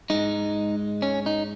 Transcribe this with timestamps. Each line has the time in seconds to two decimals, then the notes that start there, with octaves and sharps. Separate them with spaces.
0.10 G#2 G#3 D#4
1.02 C#4
1.26 D#4